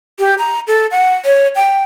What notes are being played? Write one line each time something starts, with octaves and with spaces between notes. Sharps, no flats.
G4
A#5
A4
F#5
C#5
G5